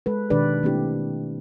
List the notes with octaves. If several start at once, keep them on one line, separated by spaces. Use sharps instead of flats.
G#3 A4 B4
B2 D#3 D4 G4 B4 D5
A3 A#3 C4 D4 E4 G4